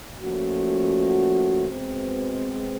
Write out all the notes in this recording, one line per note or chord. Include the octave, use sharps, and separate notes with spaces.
A#2 F3 A3 C#4 F#4
B2 G#3 C4